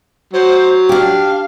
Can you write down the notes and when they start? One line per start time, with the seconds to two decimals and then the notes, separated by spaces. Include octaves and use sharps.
0.33 F#3 C5
0.89 D4 G4 F5